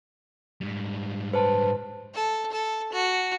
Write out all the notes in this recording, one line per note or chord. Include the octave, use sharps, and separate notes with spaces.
G#2 G3
B4 C5 A5
A4
A4
F#4